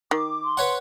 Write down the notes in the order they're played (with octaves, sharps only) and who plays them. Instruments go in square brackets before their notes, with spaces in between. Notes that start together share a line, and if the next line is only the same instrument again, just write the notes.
[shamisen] D#3 [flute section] D6
[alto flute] C6
[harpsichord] B4 C#5 F#5